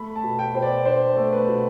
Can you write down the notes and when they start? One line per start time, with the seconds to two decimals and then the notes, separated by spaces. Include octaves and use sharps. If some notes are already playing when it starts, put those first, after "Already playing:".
Already playing: A3 B5
0.16 A5
0.23 B2
0.39 G5
0.54 B2 C5
0.62 D5
0.85 D4 C5
1.16 A3
1.33 B4
1.48 B2